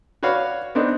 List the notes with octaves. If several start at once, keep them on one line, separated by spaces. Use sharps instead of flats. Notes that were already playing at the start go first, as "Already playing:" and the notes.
F#4 B4 C#5 D5 F5
B3 C4 D4 D#4